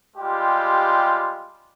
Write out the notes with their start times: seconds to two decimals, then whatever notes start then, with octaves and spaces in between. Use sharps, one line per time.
0.16 G3 G#3 F4 G4